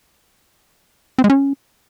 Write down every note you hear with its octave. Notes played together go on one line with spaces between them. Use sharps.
C4
G#3
C#4